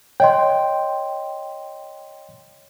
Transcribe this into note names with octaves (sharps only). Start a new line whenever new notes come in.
C#5 D#5 G5 C6